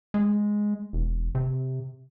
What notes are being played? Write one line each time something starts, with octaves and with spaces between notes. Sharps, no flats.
G#3
E1
C3